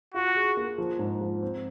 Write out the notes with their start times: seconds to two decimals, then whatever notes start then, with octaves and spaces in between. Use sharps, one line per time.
0.14 F4 F#4
0.35 G#4
0.57 A#3
0.78 F3
0.99 G#2
1.21 F3
1.43 C4